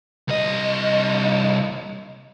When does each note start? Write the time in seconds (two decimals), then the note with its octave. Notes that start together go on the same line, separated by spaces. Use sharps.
0.28 C2 D#5